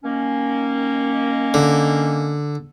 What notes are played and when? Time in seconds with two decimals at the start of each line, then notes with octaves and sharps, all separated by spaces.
0.04 D#3 A#3 C#4
1.54 D3